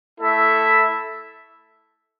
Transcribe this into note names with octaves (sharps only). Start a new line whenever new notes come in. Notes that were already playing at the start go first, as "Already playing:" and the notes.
A3 E4 A4 E5